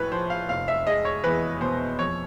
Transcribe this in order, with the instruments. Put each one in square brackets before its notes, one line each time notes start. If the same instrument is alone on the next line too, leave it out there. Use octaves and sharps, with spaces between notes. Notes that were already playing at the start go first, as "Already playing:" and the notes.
Already playing: [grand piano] A#1 A2 B4 C#5
F3 C5
F5
F1 F5
E5
G#3 D#5
C#5
E2 B4
B2 C5
F2 C#5